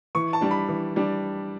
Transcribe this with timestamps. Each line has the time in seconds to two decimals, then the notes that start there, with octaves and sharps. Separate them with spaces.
0.15 E3 C#6
0.33 A5
0.41 G3 D4
0.51 B5
0.69 E3
0.96 G3 D4